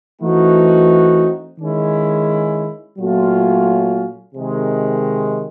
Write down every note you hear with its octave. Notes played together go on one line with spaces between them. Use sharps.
E3 A3 C4 D#4 F#4
D#3 G#3 C#4 E4
A#2 F#3 A3 C#4 F4
C3 D#3 G#3